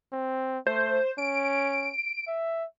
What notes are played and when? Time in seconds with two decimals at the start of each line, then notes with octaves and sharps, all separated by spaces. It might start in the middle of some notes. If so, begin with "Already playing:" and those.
0.12 C4
0.67 A3 C5
1.18 C#4 D7
2.28 E5